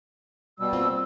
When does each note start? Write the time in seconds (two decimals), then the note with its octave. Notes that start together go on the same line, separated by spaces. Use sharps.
0.60 B2 G3 E6
0.73 A#3 C4 F4